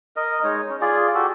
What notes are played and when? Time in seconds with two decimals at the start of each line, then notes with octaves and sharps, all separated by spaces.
0.16 A#4 D#5
0.44 G#3 D#4 C#5
0.69 C#4
0.81 F4 G#4 D5
1.15 F#4 G4 A4